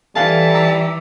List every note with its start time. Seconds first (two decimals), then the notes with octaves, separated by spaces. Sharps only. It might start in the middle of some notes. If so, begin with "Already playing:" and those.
0.16 E3 G3 A4 F5 G#5 A5
0.54 A#5 D6 E6